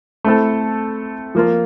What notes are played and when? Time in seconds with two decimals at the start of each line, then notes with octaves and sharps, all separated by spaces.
0.24 A3 C4 E4 A4
1.35 F3 A#3 F4